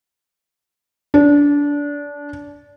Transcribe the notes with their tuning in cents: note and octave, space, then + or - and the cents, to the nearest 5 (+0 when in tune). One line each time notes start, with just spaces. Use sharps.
D4 -25